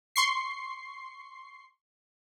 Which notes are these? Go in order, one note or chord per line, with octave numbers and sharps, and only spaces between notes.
C6 C#6 C7